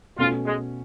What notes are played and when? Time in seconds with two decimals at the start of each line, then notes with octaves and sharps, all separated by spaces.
0.18 B2 A3 C#4 F4
0.46 G#3